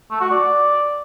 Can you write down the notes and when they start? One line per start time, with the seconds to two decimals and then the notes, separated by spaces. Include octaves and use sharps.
0.11 A3
0.21 F#4
0.31 D5